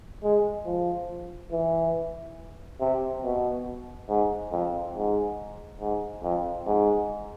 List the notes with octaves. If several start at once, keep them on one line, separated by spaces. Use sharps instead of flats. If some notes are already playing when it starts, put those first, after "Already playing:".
G#3
F3
E3
C3
B2
G#2
F2
G#2
G#2
F2
G#2